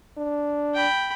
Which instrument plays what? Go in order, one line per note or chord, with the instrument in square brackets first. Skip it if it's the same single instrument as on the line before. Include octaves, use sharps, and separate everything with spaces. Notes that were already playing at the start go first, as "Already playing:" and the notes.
[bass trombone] D4
[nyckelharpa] G5 B5